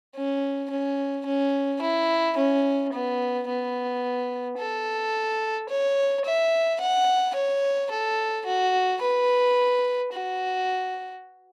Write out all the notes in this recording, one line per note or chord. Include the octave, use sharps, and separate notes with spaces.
C#4
C#4
C#4
E4
C#4
B3
B3
A4
C#5
E5
F#5
C#5
A4
F#4
B4
F#4